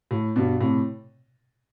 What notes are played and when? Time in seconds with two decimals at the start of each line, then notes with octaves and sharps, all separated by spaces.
0.11 A2
0.36 G2 B2
0.60 A2 C3